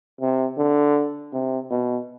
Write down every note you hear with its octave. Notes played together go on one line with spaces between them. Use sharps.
C3
D3
C3
B2